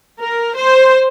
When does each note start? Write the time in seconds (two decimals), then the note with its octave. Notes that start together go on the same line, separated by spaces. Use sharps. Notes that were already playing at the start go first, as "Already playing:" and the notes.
0.21 A#4
0.56 C5